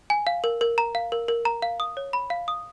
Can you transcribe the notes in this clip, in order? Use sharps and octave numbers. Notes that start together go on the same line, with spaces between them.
G#5
F5
A#4
A#4
A#5
F5
A#4
A#4
A#5
F5
D#6
C#5
B5
F5
D#6